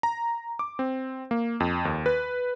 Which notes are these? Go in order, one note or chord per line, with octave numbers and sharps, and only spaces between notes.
A#5
D6
C4
A#3
F2
D#2
B4